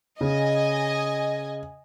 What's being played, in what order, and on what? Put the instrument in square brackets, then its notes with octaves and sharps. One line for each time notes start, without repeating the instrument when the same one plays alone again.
[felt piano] C#3 [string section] D#5 G#5